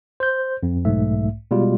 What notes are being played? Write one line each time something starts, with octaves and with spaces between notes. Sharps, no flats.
C5 G6
F2
B1 G#2 A3 E5
B2 G3 G#3 F4